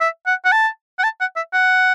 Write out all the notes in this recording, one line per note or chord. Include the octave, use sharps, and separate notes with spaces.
E5
F#5
F#5
A5
F#5
A5
F#5
E5
F#5